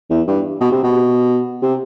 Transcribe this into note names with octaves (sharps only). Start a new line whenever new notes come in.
E2
G2
B2
C3
B2
C3